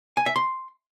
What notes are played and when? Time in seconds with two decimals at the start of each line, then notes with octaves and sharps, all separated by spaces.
0.17 G#5
0.26 E5
0.36 C6